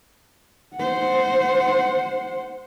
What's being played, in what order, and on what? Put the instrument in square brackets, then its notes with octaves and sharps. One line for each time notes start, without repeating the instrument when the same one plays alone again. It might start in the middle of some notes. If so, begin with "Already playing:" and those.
[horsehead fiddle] C5 F#5